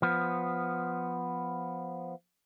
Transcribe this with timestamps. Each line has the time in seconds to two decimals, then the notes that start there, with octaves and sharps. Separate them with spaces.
0.02 F3 B3